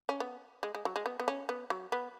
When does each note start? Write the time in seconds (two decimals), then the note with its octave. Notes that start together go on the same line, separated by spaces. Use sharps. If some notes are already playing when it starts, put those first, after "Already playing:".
0.09 C#4
0.20 B3
0.63 G#3
0.75 G#3
0.85 F#3
0.96 G#3
1.06 B3
1.20 B3
1.28 C#4
1.49 B3
1.70 F#3
1.92 B3